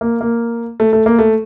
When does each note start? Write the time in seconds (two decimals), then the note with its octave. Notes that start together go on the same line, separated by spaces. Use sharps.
0.01 A#3
0.21 A#3
0.80 A3
0.93 A3
1.06 A#3
1.19 A3